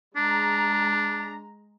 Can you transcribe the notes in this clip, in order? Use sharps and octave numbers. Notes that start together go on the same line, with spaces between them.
G#3 D4 A#5